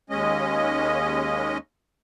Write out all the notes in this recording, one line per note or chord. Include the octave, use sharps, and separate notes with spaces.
D#2 G#3 C#4 D#5